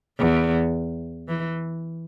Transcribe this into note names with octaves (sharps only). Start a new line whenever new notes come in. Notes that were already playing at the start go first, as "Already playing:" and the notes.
E2
E3